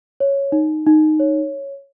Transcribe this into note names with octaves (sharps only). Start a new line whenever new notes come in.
C#5
D#4
D#4
C#5